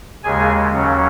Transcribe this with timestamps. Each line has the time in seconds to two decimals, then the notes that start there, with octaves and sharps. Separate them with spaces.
0.23 D#2 C#3 G#3 G#4 G#5
0.72 D#2 C#3 F#3 C#4